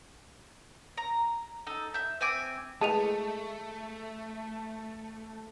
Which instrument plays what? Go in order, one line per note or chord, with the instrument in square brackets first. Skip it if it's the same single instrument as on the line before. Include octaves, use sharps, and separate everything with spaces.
[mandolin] A#5
D#4 A4
E5 G6
C4 E5 G#5 D6
[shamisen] G#3 E4 B4 [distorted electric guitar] A3 [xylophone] G#4 D#7 F7 [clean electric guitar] A5